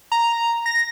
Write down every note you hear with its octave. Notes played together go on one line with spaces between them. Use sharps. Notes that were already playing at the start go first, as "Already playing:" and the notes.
A#5
A#6